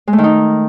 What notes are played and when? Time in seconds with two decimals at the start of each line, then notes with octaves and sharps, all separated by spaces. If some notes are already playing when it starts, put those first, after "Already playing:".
0.07 G#3
0.13 A3
0.18 D#3
0.24 D#4